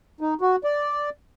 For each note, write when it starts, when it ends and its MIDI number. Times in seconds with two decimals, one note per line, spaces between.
0.21 0.34 63
0.41 0.56 66
0.64 1.10 74